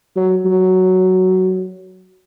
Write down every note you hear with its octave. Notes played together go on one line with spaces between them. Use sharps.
F#3
F#3